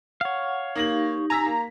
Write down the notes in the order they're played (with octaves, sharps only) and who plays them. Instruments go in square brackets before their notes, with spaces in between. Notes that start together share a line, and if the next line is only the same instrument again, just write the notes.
[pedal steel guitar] C#5 F5 [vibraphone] F#5
[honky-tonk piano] A#3 A#6 F#7 [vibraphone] D#4 G4
[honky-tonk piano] G#5 E6 B6 [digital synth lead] A#5
[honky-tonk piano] A#3